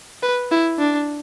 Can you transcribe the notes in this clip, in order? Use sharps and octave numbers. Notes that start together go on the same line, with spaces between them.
B4
E4
D4